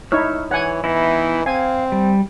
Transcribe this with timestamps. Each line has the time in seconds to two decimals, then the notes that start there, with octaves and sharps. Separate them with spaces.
0.12 D#4 E4 C#5 E6 F6
0.51 E3 C#5 F#5 G#5
0.84 E3 B3 D#4 E4
1.46 C4 F5 G#5
1.92 G3